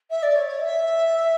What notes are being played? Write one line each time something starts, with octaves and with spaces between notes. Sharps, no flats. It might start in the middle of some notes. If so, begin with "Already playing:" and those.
E5
D5
C#5
C#5
E5